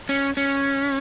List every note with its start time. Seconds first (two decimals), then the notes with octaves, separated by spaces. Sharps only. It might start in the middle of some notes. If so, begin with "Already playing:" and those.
0.09 C#4
0.37 C#4